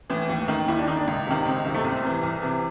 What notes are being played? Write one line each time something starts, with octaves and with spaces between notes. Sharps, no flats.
A2 E3
D#2
D#3
D#2 E4
D4
D#3 D#4
D4
C#2
C3 D#3
C#2 C4
C3 D#3
A3
C2 C4
C3 E3
C2
C3 E3